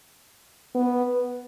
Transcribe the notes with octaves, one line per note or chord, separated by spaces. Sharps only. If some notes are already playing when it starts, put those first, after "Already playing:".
B3